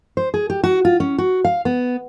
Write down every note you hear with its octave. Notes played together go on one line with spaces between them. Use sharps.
C5
G#4
G4
F#4
F4
C#4
F#4
F5
B3